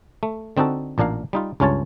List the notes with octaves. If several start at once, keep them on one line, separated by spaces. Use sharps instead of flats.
A3
D3 C4 D#4 F#4 A4
A1 A#2 D4 A#4 F5
G3 D#4 F4
C#2 G2 C#4 F4 C#5 A5